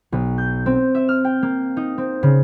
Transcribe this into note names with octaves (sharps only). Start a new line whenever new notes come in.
B1
G6
C4
E5
F6
G5
A#3
D#4
C4
C#3